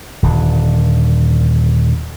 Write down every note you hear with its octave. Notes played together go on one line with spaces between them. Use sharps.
D#1 D3